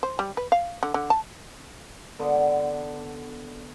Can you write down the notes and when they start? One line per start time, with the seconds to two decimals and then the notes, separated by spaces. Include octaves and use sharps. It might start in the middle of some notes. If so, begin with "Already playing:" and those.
0.03 C5
0.19 G3
0.37 B4
0.52 F5
0.83 D3
0.94 D3
1.10 A5
2.19 D3 B3